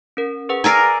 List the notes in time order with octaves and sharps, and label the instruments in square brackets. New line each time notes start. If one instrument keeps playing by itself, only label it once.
[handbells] C#4 A#4
G#4 B4 F#5
[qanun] A#4 D5 G#5 [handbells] A#5 E6 C7